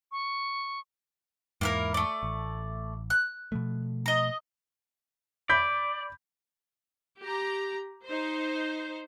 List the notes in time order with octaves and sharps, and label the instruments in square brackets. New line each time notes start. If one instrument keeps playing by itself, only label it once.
[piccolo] C#6
[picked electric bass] E2 G#2 [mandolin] A#3 E4 A#4
[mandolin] A3 D5
[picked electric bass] A1
[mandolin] F#6
[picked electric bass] B2 F3 A3
[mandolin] D#5 A#5
[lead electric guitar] D5 [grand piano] B5 G6 B6
[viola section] G4 A#5
D#4 C5